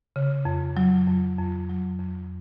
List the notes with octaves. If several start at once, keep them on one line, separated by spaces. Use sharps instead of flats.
C#3
F2
F#3
F2
F2
F#3
F2